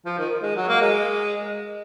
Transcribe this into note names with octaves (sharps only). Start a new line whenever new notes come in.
F3
D#3
G#3
F#3
A#3
G#3